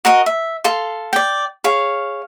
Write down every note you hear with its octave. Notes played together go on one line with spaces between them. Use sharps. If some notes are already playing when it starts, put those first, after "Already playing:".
F#4 A#4 D#5
E5
A4 F5 C6
D5 G5
G#4 C#5 F5